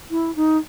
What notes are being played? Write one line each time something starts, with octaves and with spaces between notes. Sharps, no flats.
E4
D#4